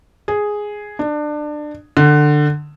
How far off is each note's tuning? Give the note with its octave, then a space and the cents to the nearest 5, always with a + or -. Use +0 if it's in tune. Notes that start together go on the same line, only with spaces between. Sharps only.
G#4 +0
D4 +25
D3 +20